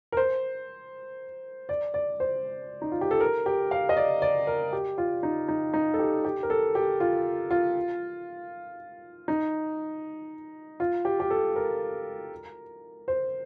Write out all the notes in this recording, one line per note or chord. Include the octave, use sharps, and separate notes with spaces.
A#4
C5
D5
D5
C5
D#4
F4
G4
A4
A#4
G4
F5
D#5
D5
D5
A#4
G4
F4
D#4
D#4
D#4
A4
G4
G4
A#4
A4
G4
F4
F4
D#4
F4
G4
G4
A4
A#4
C5